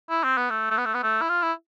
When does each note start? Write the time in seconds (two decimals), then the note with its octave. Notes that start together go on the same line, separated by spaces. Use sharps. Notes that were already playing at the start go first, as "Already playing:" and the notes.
0.10 E4
0.24 C4
0.37 B3
0.50 A3
0.70 A3
0.78 B3
0.86 A3
0.95 B3
1.03 A3
1.21 E4
1.29 F4
1.42 E4